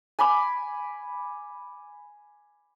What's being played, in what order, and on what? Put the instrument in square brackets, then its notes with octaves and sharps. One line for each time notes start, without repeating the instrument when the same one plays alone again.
[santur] G#5 B5 D6